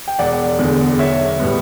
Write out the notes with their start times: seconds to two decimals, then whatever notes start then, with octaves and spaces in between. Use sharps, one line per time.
0.08 G5
0.19 E1 D5 F#5
0.59 E2 D3
0.99 B1 C#5 E5
1.39 A2 G3 B3